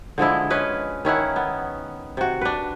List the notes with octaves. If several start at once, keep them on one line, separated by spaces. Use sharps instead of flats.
D3 F3 G#3 E4
C#4 B4 D#5
D#3 C#4 E4 F#5
B3
C3 F#4
D4 B4